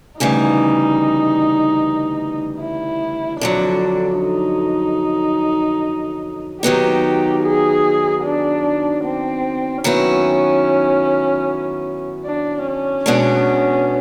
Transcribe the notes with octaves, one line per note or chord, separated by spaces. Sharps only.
D2 C#3 E3 G3 D#4
E4
F2 D3 F#3 D4
D#4
D#3 F#3 B3 D#4 G4
G#4
D4
C4
D#3 F#3 B3 C#4 E4
D4
C#4
B2 G#3 B3 D4